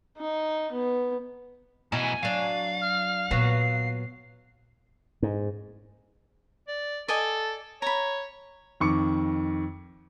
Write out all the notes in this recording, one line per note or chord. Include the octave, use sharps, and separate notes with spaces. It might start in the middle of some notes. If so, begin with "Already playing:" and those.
D#4
B3
F#2 B2 E3 E4 D#5 G#5
F#3 D4 F5
F6
A#2 F#3 B3 C7
G#2
D5
A4 D5 D#5 G#5
C#5 A#5 B5
F2 D#3 C#6 D6 C#7